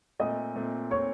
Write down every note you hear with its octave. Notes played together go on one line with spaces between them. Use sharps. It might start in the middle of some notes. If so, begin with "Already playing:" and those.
A#2 A3 C4 D#5 D#6
A#2 A3 C4
A#2 A3 C4 C#5 C#6